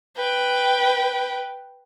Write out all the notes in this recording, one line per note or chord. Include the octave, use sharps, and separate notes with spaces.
B4 G5